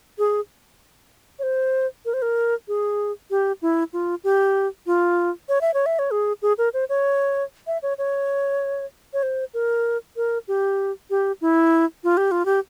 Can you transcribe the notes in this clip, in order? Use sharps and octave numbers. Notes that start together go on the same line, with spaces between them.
G#4
C#5
C5
A#4
C5
A#4
G#4
G4
E4
F4
G4
F4
C#5
E5
C#5
E5
C#5
G#4
G#4
A#4
C5
C#5
E5
C#5
C#5
C#5
C5
A#4
A#4
G4
G4
E4
F4
G4
F4
G4